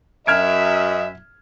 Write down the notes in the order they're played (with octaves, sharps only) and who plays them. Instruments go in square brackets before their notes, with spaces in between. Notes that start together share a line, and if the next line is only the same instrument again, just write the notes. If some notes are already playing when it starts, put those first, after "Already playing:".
[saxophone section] F#2 [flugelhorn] D#5 [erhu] E5 [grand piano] F6 G#6 D7